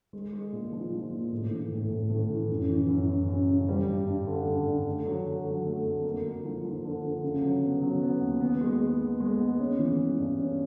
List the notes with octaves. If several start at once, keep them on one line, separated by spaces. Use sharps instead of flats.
G#3
G#3
A#2
F3
F3
A#2
A2
E3
A2
A2
A2
E3
F#2
E3
F#2
F#2
F#2
C#3
G3
G2
G2
D3
G2
G2
A3
F#3
D3
F#3
A3
F2
A#3
D3
F3
F3
D3
D3
C#3
F#3
B3
F#3
B3
D#2
B3
G#3
G#3
B3
G#3
B3
C#4
E3
G#3
G2
C#4